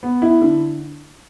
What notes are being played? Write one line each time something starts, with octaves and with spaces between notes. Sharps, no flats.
B3
E4
D3